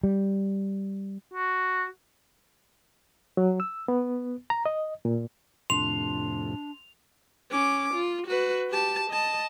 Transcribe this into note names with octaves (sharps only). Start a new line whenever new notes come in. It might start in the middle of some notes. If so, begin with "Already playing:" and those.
G3
F#4
F#3
E6
B3
A#5
D#5
A#2
F2 A2 C3 D4 C6 F7
C#4 D6
F4
F#4 B4
G4 A5
D#5 A5